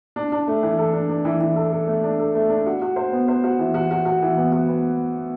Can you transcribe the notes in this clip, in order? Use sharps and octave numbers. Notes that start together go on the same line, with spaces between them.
D4
D4
A3
E3
A4
D4
D4
E3
E3
A4
A4
A3
D4
A4
A3
D4
F#4
F#4
C5
B3
C5
F#4
E3
F#4
F#4
F#4
E3
B3
F#4
B3